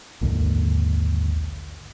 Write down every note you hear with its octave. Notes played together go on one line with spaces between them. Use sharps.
A#1 D#2 G#2 D3